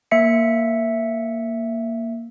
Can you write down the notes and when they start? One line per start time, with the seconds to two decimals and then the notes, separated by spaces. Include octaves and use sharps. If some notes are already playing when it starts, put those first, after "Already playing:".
0.11 A#3 E5 C#7